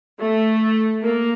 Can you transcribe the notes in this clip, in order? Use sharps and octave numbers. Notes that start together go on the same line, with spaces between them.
A3
A#3